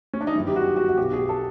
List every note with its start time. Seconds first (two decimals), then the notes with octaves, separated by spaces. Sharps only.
0.14 C#4
0.21 D4
0.27 D#4
0.35 G1 F#2 D#3 E4
0.47 G4
0.56 F#4
0.77 F#4
0.89 F#4
0.97 B1 B2 G4
1.13 G#4
1.29 A4